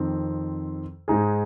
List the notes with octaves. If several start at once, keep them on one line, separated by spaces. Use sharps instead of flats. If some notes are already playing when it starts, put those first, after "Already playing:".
Already playing: F2 D#3 C4
G#2 G#3 D#4 G#4